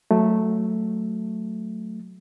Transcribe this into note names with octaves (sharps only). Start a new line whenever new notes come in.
F#3 A3